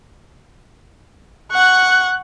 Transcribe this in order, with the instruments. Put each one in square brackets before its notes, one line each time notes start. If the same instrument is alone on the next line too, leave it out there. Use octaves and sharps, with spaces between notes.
[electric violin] F#5 C#6 [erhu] F#6